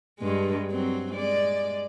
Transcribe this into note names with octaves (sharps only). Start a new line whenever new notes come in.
G2 G#3
F#3 C4
G#3 D5